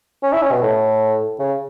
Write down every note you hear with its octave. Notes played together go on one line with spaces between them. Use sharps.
C#4
E4
C#4
B2
A2
C#3